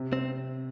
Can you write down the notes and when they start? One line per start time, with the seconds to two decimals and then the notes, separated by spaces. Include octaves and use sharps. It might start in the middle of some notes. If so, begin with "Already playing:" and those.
Already playing: C3
0.13 C4